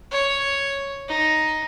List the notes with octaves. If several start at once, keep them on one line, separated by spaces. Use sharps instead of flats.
C#5
D#4